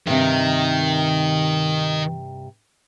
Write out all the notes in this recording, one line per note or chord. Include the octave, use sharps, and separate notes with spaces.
G2 C3 D#3